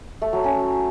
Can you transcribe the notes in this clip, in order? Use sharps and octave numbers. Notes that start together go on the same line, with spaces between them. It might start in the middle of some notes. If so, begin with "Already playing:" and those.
A3
F#3
C#4